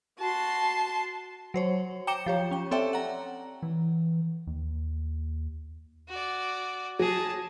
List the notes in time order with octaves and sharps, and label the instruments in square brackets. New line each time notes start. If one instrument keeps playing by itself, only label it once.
[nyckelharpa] F#4 [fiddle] A5 C6
[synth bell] F#3 C5 C#5
G5 A#5 D6 C#7 E7 G7
F3 G4 C#5
C#4 G5
C4 A4 C#5 D5 E5 G5
F#5 A#5
[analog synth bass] E3
D#2
[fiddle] F#4 D5
[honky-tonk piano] F#3 [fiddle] G#4 A5